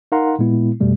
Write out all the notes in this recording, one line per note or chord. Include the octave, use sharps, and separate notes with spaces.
D#4 A#4 F5 F#5 A#5 C6
A#2 G#3 B3 E4
F2 B2 G3 A3